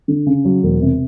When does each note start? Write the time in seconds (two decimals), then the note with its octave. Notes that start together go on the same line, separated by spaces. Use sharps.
0.08 D3
0.26 C#3
0.45 F#3
0.63 E1
0.81 C3